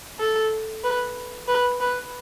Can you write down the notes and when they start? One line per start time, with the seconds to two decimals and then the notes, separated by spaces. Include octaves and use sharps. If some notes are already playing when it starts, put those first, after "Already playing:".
0.20 A4
0.84 B4
1.48 B4
1.80 B4